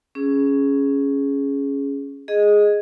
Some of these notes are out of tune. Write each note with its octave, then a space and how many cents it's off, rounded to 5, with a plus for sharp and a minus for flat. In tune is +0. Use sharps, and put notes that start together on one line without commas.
C#4 +0 G#4 +5
G#4 +0 D#5 +0